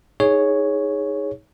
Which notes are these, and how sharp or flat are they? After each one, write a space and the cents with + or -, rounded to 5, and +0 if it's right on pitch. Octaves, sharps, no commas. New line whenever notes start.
D#4 +15 G#4 +0 C#5 +0